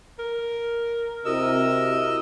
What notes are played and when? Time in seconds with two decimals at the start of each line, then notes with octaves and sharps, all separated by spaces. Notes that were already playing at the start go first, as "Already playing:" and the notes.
0.19 A#4
1.25 C3 E4 F#4 A#4 D#5 E6